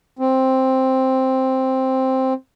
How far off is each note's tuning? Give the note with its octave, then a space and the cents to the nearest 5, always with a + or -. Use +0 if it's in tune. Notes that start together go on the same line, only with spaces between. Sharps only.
C4 +5